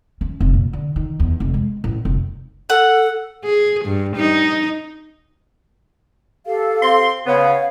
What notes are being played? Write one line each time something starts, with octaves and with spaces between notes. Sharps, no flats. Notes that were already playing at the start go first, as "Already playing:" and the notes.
C#4
F1
A#2
D3
D#3
E2
F1
G#3
A1
F1
A4 F#5
G#4
G2
D#4
G4 A4 F5
C4 C6
C#3 B3 C#5 F5